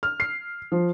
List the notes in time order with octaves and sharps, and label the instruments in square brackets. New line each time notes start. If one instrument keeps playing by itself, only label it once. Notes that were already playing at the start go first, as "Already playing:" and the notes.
[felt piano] F6
C7
F3